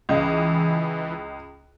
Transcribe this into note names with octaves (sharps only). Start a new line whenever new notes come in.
C#2 E3 D#5